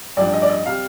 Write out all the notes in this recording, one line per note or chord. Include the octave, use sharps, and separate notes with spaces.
A1 G2 F3 D5
D#5
D5
D#5
C3 G3 F5